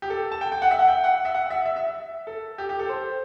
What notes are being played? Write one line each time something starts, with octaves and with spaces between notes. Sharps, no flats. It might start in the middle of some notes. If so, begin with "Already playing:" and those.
G4
A4
A5
G5
G5
F#5
E5
F#5
G5
F#5
E5
F#5
E5
E5
E5
A4
G4
G4
A4
C5